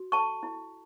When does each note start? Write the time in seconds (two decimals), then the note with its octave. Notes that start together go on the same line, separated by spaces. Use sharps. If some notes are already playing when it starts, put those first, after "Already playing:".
Already playing: F#4
0.12 A4 A5 C#6
0.43 E4